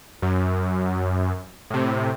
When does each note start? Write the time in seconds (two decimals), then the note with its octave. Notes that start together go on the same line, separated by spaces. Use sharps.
0.22 F#2
1.70 A2 C3